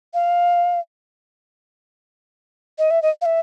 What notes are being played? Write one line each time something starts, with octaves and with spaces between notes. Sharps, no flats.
F5
D#5
E5
D#5
F5
E5